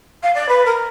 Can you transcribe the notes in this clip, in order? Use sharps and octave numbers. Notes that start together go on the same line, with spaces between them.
F5
D5
B4
A#4